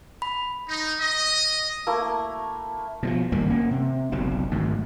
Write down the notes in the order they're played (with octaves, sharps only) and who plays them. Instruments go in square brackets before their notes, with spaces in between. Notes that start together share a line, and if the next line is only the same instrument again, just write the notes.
[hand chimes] B5
[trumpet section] D#4
D#5
[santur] A3 A#3 E4 A#4
[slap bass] B2 E3 F3
G#1 G2 D3 A#3
A#3 C#4
C3
F#1 B1 F#3 C4
G#1 D2 G#2